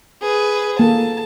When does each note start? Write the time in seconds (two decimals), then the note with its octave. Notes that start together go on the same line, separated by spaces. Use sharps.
0.22 G#4 B4
0.79 A#3 A4 A5